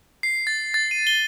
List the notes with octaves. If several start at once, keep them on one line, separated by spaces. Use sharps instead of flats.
C7
A6
A6
D#7
G7